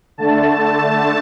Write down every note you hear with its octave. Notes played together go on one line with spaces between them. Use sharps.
D3 A3 A5